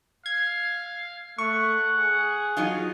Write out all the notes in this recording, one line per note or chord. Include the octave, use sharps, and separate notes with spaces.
F5 G#6
A3 F#5 C#6
G#4
F#3 D#4 F4